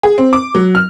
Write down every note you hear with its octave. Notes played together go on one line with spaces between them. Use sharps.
G#4
C4
D6
F#3
F6